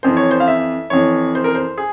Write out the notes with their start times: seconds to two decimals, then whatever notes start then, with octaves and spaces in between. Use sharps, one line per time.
0.03 F2 E3 C5
0.17 C#5
0.31 C5
0.40 F5
0.47 E5
0.90 F2 E3 C#5
1.35 C5
1.44 A#4
1.55 C5
1.78 G#4